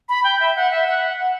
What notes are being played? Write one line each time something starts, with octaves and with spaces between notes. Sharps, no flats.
B5
G5
E5
F#5
E5
F#5
F#5